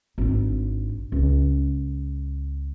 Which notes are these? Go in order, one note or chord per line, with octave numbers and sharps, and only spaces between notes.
G#1 D4
C#2